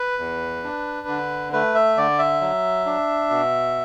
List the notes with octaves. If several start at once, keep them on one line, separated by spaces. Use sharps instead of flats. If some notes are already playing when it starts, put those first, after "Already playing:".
Already playing: B4
E2
D4
D3
A3 B4
E5
D3 D5
E5
F#3
D4
B2